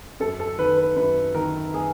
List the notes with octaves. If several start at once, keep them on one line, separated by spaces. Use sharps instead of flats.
F#2 A4
A4
D#3 B4
B4
F#2 B4
D#3 A#4
G#4